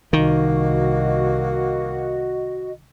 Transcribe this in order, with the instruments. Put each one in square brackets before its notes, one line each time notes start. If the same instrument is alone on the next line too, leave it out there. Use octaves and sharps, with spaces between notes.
[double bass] C2 [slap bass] D#3 [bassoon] A#3 [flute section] F#4 D#5